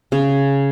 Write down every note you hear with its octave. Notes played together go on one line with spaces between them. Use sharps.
C#3